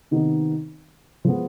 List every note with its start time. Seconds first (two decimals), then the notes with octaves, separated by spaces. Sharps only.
0.11 C3 D#3 B3 D#4
1.25 F3 G#3 B3